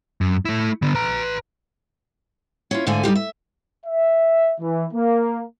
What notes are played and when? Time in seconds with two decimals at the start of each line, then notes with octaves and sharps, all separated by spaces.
0.21 F#2
0.45 A3 E4
0.82 D3 B3
0.95 B4 A#5
2.71 C#4 E4 F4
2.87 G#2 D3 A3 F5 G#5
3.03 G3 D#4 F4 G4
3.15 E5
3.85 E5
4.60 E3
4.92 A#3